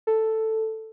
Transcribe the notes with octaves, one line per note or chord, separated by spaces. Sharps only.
A4